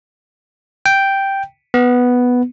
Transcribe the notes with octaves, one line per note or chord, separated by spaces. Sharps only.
G5
B3